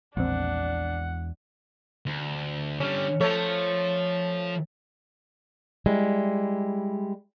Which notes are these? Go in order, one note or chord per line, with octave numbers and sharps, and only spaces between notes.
A#1 E2 G#3 C4 D4 F#5
D2
D3 G3 C#4
F3 A3 C#5
G3 G#3 E4